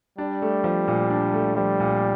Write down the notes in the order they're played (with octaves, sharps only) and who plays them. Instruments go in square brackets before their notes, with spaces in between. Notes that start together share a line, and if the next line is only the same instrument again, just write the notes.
[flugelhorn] G3 [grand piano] D4
[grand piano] A3
F3
A#2
D4
A3
[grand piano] F3 [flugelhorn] G3
[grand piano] A#2